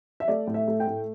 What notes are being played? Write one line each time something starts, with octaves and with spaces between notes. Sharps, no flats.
E5
A3 D5
A2
E5
A3
G5
A2